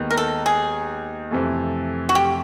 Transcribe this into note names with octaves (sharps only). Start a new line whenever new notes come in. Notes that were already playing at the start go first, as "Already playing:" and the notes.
Already playing: D#2 D#3 G#3 B3 D#4
A#4
A4
G#4
F2 C3 E3 A3
F#4
G4